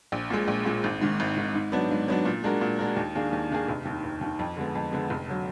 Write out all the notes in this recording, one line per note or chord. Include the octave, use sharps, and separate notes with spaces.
A#1
A#2 G#3
A#1
A#2 G#3
G#1
G#2 D#3
G#1
G#2 D#3
G#2
F#3 B3 D4
G#2
F#3 B3 D4
A#2
G#3 D4 F#4 A#4
A#2
G#3 D4 F#4 A#4
D#2
D#3 A#3 D4 G#4
D#2
D#3 A#3 D4 G#4
F1
D#2 D#3
F1
D#2 D#3
F2
D3 G#3 B3
F2
D3 G#3 B3
F1
D3 F#3